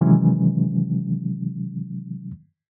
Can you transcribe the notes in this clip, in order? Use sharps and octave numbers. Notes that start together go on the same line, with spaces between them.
C3 D#3 E3 F#3 G#3 C#4